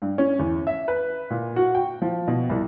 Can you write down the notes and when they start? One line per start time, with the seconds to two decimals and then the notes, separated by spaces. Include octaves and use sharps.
0.02 G2
0.18 C#4
0.39 E2
0.67 E5
0.88 B4
1.30 A#2
1.56 F#4
1.75 G5
2.02 F3
2.28 B2
2.50 C2